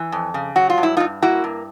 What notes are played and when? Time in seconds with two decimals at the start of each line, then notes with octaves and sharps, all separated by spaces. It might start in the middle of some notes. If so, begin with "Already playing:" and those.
Already playing: E3
0.12 F2
0.34 C#3
0.56 F#3 F#4
0.70 F4
0.78 G2
0.83 E4
0.97 D#4 F4
1.00 G2
1.22 A#3 E4 F#4
1.44 G2